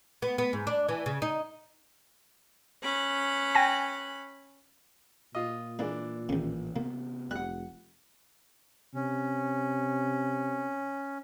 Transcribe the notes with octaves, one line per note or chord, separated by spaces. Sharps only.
B3
B3
G#2
D4
E3
C#3
D#4
C#4 B5 F#6
G5 G#5 A#6
A#2 F4 D#5
E3 G#3 A#3 D4
A1 D#2 C#3
C3 A#3 B3
F1 G3 F#5 F#6
C3 C#4